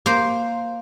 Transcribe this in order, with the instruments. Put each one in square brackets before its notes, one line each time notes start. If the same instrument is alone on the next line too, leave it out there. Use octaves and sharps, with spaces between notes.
[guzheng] A#3 C5